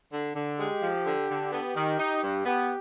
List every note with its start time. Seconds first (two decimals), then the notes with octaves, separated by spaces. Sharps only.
0.12 D3
0.35 D3
0.59 G#3 G4
0.82 F3
1.06 D3
1.29 D3
1.53 B3 G4
1.76 D#3
1.99 D#4
2.23 G2
2.46 B3 G4